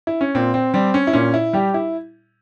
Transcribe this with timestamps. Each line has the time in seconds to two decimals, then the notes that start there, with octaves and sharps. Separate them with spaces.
0.07 E4
0.21 C#4
0.35 A#2 C4
0.54 C4
0.74 G3 C4
0.94 C#4
1.07 E4
1.13 A#2 C#4
1.34 E4
1.53 G3 G4
1.74 E4